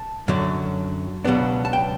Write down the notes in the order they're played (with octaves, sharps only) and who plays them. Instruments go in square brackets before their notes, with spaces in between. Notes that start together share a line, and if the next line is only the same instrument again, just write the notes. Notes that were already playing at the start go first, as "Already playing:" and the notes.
Already playing: [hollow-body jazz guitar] A5
F#2 D3 F#3
C#2 B2 F#3 B3 D4
A5
G5